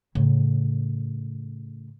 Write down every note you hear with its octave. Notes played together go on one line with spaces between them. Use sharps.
A2 C#3